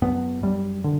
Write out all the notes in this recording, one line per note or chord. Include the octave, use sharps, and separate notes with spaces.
F#2 B3
F#2 G3
D3